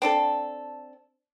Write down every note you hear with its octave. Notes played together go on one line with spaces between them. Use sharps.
C4 D4 A4